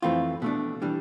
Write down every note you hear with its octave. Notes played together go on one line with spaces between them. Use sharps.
F2 E3 A3 C4 F4
B2 A3 D4
E3 G3 D4